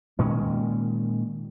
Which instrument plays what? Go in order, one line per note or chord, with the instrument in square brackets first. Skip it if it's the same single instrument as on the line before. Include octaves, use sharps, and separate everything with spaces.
[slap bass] A#2 D#3 G#3 C#4